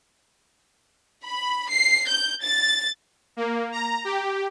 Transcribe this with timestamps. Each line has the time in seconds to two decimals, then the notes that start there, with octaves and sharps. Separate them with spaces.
1.24 B5
1.69 C7
2.08 G6
2.41 A6
3.37 A#3
3.72 A#5
4.05 G4